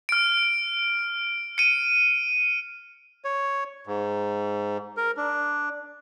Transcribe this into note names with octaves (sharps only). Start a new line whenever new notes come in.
F6 D7
C#7 D#7
C#5
G#2
A#4
D4